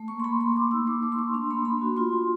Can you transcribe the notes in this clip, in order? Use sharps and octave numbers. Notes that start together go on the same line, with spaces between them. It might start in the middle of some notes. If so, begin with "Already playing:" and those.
Already playing: A3
A#3 C#6
C6
A#3 B5
A#3 C6
A#3 D6
D#4 E6
A3 D6
A3 D6
C6
A3 C#6
D4 C6
A#3 B5
D4 B5
F#4
F4 C6
F4